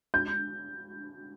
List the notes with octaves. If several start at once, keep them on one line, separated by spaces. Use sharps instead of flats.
G6